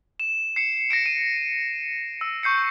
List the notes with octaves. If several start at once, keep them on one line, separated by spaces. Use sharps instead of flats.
E7
C7 C#7 E7
A#6 C#7 D7 E7
D#7
E6
C#6 G6 C7 C#7